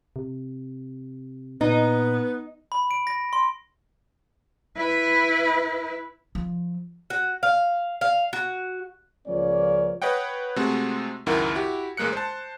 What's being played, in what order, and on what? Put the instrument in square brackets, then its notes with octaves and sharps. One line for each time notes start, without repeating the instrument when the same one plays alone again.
[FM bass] C3
[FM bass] A#2 [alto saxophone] B3 [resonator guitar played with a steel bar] D#4
[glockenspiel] B5
D7
A#6
C6
[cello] E4 B4
[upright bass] F3
[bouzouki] F#4
F5
F5
F#4
[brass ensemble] C#2 F3 A#3 C#4 C#5 D5
[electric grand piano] B4 C#5 D#5 F#5 G5
C3 G#3 A3 C4 F#4
C#2 F#2 D#3 E4 A#4 F#5
E4 F#4 G4
A1 G#3 A#3 F#6 C#7
C5 A5